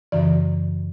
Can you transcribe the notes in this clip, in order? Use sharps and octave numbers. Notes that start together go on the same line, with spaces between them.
F#2 C#3 E3 D5